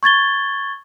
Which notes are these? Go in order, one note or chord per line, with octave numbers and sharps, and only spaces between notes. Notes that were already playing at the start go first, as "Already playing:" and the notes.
C#6 G#6 A6 G7